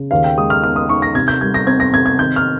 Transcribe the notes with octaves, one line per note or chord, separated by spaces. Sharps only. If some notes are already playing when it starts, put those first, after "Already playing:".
Already playing: C#3
D#2 F5
G5
G#3 D#6
F6
D#4 F6
D#6
D#4 C#6
A#6
C3 G#6
G6
G3 G#6
A#6
C4 G#6
A#6
C3 G#6
G#6
D#3 G6
F6